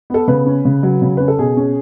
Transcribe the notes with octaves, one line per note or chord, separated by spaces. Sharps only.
B3 A4
C#3 B4
C#4
C#3
F#3
C#3
C#4 B4
A4
B2 G#4
C#4